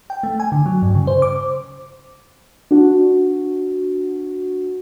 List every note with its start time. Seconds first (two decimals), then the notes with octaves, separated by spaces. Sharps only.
0.10 G5
0.23 A3
0.40 G#5
0.52 D3
0.66 F#3
0.82 G2
0.95 C#3
1.07 C5
1.22 D6
2.71 D4 F#4